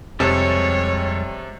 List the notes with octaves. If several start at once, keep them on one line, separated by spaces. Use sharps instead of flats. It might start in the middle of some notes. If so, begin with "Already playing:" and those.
F2 C3 G3 G#3 A4 C#5